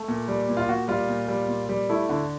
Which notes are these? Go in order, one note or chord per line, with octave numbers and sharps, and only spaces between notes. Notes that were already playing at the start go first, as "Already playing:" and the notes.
Already playing: A3
A#2
G3
A#2
F4
A#2 F#4
G3 F4
A#2
G3
A#2
G3
A3 E4
D3